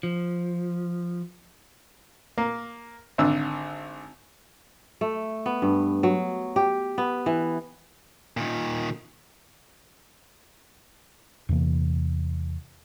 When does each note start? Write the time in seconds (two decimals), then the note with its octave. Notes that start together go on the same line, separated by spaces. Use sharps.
0.03 F3
2.38 A#3
3.18 G#1 D3 E6
5.01 A3
5.46 B3
5.62 G2
6.03 F#3
6.56 G4
6.98 B3
7.26 E3
8.37 A#2 D#3
11.49 E2 C3 E3 A#3